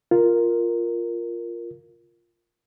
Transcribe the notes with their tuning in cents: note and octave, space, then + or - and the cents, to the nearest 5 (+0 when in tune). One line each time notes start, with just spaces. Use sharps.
F4 +0 A#4 +0